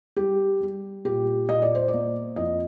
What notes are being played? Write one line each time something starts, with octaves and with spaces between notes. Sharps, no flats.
G3 G4
G3
A#2 G4
A#2 D#5
D5
C5
D5
A#3
F2 D#5